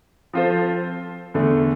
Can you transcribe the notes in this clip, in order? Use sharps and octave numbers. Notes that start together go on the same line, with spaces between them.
F3 C4 F4 A4 C5
E2 D3 A3